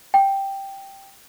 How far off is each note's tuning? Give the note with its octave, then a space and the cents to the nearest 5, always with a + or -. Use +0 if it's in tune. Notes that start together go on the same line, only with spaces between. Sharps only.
G5 +0